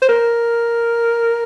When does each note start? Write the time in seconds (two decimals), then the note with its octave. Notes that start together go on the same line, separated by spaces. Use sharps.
0.02 C5
0.09 A#4